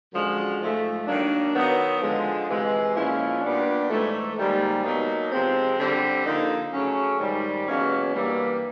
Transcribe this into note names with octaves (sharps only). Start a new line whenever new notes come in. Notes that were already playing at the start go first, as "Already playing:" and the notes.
F#2 D3 F3 G#3
G#2 F3 A3
D#3 F#3 A#3 D4
D#3 F#3 B3 D#4
D3 F3 G#3
C3 E3 G#3
A#2 F3 G#3 C#4 E4
A#2 G3 B3 D4
G#2 E3 A3
G#2 D#3 G3 A#3
B2 F#3 A#3 D#4
C3 F3 G#3 C4
D3 G3 C4
D3 F3 A#3 D#4
C#3 F#3 A3 C#4
G#2 D#3 G3
E2 B2 F#3 A#3 C#4
G2 E3 G3 A#3